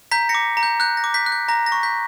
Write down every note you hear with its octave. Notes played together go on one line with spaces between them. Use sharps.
A#5 G6 B6
A#6 C#7
D6
A#5
G6
F#6 G6
A#6
D6
G6 B6
F#6
G6
A#5 A#6
A#6
C#6
G6 B6